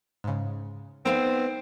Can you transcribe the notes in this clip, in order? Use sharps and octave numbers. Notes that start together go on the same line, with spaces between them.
G#2 C#3
B3 C4 D#4 A#4 C5 D5 F5